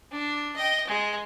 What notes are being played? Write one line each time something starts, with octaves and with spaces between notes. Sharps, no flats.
D4
D#5 G5
G#3